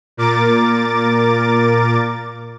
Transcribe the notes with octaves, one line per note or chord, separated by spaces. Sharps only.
A#2 A#4 D6 A6